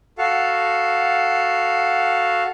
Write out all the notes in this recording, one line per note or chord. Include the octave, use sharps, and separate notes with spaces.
F#4 A4 F5